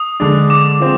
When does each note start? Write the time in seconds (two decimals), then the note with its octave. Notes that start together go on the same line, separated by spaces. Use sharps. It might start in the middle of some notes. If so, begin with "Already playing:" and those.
Already playing: D#6
0.20 D3 G#3 D4
0.50 D6
0.80 F3 G#3 C4